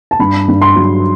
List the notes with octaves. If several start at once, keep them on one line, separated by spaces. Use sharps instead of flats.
A5
G2 B5
G2
C6
F#3